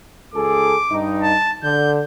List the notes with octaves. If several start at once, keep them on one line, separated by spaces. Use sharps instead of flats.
C#2 G#4 A4 D6
G2 D#4
A5
D3 G6